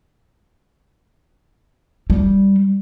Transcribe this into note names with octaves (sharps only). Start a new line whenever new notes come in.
G3